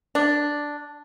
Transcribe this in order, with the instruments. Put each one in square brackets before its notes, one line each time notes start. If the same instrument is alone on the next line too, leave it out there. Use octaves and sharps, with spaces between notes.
[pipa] D4